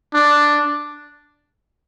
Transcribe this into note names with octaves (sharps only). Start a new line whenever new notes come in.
D4